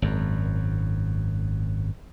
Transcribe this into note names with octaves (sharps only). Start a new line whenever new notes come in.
G#1 F#2